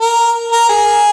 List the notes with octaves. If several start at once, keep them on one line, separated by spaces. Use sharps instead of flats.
A#4
A#4
G#4